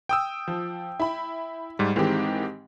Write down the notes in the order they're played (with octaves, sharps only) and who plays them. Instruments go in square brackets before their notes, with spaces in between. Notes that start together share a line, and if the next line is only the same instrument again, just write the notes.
[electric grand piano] G5 D#6 E6
[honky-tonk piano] F3
E4 B5
[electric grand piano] G#2 G3
[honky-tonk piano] G#2 D#3 E3 [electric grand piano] G#3 C4 G4